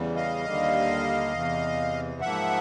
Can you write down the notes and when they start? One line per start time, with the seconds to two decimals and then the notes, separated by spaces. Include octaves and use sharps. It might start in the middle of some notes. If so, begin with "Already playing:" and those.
Already playing: E2 C#3 E3 G3
0.16 D#5 F5
0.45 D#2 D3 G3 A#3
1.33 E2 C3 E3
2.21 G#2 F3 A#3 E5 F#5